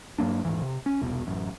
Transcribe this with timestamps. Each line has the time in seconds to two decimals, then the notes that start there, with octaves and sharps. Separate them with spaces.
0.18 G2 F#3 A#3 D4
0.45 D#1 C2 G#2 E3
0.61 C3
0.86 C#4
1.01 E1 C2 B2
1.27 A1 F#2